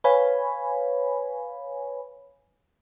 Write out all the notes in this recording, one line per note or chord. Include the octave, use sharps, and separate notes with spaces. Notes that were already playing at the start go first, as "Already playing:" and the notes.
B4 C#5 F5 G#5 B5